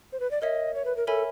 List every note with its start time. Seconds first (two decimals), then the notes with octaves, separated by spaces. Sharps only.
0.13 C5
0.20 B4
0.31 D5
0.42 A#4 C#5 D#5 E5
0.75 C#5
0.85 B4
0.97 A#4
1.07 A4 A#4 C#5 E5 G#5 B5